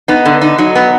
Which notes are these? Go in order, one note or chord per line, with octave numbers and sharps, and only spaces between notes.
B3 D#4
D3
D#4
F#3 D#4
B3